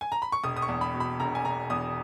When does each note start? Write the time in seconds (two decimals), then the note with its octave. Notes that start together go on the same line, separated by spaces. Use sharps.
0.01 G#5
0.12 A#5
0.22 B5
0.32 C#6
0.44 E1 D#6
0.57 D#6
0.62 C#6
0.69 E2
0.81 B5
0.94 B2
1.00 B5
1.20 E1 A#5
1.35 G#5
1.45 E1 A#5
1.70 E2 D#6